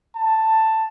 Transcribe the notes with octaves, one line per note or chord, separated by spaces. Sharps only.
A5